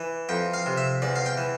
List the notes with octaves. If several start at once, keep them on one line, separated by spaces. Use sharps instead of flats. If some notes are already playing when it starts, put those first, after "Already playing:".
Already playing: E3
F2 G5
F5
C3
E5
E2 D5
F5
G5
E3